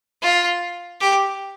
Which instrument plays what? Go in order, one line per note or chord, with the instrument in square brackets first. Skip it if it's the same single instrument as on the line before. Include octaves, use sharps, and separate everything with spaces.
[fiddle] F4
G4